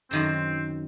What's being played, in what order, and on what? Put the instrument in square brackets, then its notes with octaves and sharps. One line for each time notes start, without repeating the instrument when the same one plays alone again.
[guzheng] F#2 D#3 C5 [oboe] C4